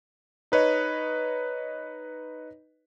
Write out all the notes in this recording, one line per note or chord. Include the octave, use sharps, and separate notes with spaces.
D#4 B4 C#5 D#5